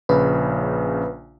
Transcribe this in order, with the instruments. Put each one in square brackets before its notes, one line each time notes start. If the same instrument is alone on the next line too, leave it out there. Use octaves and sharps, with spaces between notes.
[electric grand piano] A#1 C#3 [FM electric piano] B4